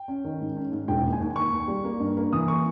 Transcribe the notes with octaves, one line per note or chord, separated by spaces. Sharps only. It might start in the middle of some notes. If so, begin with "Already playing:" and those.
Already playing: G5
C#4
D#3
G#2
C#4
G#2
E1 G5
D#2
G#5
D#2
D#2 C#6
D#2
G3
A#3
G2
A#3
E3 D#6
A#3 C#6